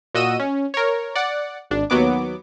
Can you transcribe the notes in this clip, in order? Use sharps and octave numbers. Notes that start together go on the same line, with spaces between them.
A#2 F#4 D#5 E6 D#7
C#4
A#4 C#5
D5 F#5
G#1 D4
D#2 F#3 B3 D6